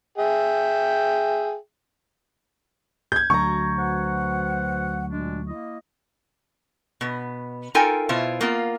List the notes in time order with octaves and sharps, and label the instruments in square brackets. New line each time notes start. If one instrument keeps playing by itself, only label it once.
[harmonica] G#4 E5 G5
[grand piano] G6 G#6
[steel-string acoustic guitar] D2 F#3 A#5 [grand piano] C#6
[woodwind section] B4 C5 F#5
A#2 G#3 D4
A#3 E4 D#5
[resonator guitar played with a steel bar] B2 B3
D#4 F4 A4 A#4 G5 G#5
B2 E4 F4 C5
A#3 B3 F4